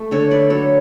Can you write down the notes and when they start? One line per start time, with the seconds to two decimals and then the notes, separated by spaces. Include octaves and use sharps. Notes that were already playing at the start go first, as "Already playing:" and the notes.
Already playing: A3
0.11 D3 A4 C#5
0.30 D3 B4 D5
0.50 F#3 A4 C#5